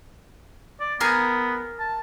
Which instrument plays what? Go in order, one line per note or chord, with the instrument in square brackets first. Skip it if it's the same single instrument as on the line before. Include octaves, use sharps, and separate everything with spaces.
[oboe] D5
[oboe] B3 [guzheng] G#4 A#4 G#5
[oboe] A5